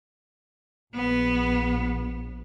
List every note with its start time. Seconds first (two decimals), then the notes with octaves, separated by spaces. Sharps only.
0.95 A#1 B3